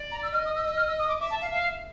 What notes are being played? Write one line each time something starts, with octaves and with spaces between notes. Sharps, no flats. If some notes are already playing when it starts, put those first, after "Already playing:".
Already playing: D5
A#5
E6
D#5 F6
D#6
E6
E6
F6
E6
D#6
D6
E5 D6
A5
F5
F5